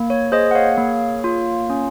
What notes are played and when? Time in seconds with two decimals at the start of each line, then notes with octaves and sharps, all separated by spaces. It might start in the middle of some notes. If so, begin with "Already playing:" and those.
Already playing: A#3
0.10 C#5
0.32 G#4 C5 D#5
0.51 F#5
0.55 C#5 F5
0.78 A#3
1.24 F4
1.70 C#4